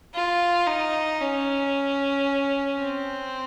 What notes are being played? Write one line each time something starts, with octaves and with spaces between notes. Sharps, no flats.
F4
D#4
C#4
C4